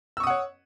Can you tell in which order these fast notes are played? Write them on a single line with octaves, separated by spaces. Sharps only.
E6 C#6 D#6 F#5 C#5